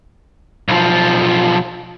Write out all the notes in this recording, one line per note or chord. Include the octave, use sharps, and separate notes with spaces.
B1 F3